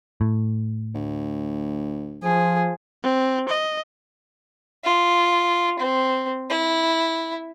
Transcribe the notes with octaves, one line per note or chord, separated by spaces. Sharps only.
A2
D2
F3 G#4
C4
D#5
F4
C4
E4